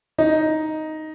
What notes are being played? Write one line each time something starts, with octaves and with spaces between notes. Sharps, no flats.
D#4